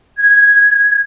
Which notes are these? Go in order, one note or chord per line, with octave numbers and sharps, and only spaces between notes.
G#6